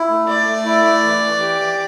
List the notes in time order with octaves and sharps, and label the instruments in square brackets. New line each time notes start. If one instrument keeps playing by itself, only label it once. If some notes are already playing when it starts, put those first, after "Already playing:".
Already playing: [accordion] E4
A3
[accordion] A3 [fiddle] D5
[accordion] A3
E4
A3
E3
E3
G4
E3